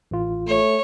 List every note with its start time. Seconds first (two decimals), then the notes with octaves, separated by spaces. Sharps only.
0.11 A1 F4
0.47 A3 C#5